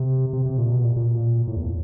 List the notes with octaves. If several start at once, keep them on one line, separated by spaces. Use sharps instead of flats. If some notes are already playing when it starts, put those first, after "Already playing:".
Already playing: C3
C3
C3
A#2
B2
A#2
A#2
A2
E2